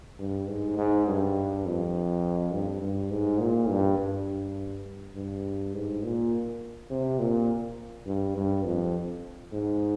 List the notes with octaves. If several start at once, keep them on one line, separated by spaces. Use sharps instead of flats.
G2
G#2
G#2
G2
F2
G2
G2
G#2
A#2
G2
G2
G2
G#2
A#2
C3
A#2
G2
G2
F2
G#2